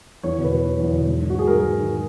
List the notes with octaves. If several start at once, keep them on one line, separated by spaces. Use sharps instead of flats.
E2 C#5
B2
B4
F#3
E2
E2
B2
G#2
D#3
F#4
F#3 G#4
G#2 A#4
G#2
D#3